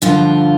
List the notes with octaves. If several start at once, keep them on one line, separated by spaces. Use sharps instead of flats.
G2 D3 F3 F4